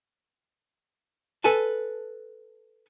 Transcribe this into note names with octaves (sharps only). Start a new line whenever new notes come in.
A4 B4 G#5 A5